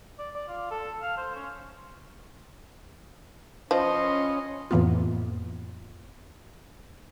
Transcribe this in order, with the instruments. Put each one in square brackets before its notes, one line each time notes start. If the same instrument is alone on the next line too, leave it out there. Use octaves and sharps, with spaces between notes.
[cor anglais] D5
D5
F4
A4
F5
C5
C#4
[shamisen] F3 [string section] C#4 [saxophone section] F4 B4 D#5 [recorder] C6
[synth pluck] F2 A2 E3 A#3 B3 F4